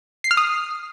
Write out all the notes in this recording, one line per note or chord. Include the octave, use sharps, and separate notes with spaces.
C7
F6
D#6